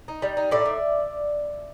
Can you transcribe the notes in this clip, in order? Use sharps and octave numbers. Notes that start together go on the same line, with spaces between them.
D#4
G3
D#4
A2 D5 E5
A2